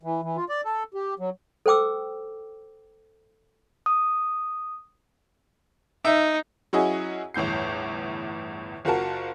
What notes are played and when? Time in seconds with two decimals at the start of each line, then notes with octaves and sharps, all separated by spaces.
0.03 E3
0.23 E3
0.37 F4
0.49 D5
0.65 A4
0.94 G4
1.19 F#3
1.66 A4 C5 G5 D6 E6
3.86 D#6
6.05 D#4 E5
6.73 F#3 C#4 E4 F#4 G#4 D#5
7.34 G1 E2 A2 G6 C7
8.85 F#1 F4 F#4 A#4 A5